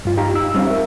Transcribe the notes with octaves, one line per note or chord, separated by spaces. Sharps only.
G2 F4
D#4 G4 F5 A#5
D#4 E6
G3 C4 C#4 F5
A#4 E5